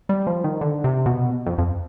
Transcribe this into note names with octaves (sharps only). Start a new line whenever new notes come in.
G3
F3
D#3
D3
C3
B2
F2
F2